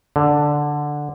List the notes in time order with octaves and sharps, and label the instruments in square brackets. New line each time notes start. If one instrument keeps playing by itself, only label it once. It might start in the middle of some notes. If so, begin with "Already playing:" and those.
[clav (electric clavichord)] D3